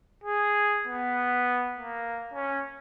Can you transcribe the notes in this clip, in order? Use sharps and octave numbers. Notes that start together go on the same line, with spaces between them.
G#4
B3
A#3
C#4